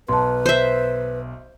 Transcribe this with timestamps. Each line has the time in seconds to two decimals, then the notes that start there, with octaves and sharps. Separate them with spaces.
0.08 B1 B4 A5 C6
0.46 C5 E5